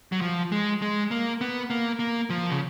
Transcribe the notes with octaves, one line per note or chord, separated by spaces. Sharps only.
F#3
F3
G#3
G#3
A#3
B3
A#3
A#3
F3
C#3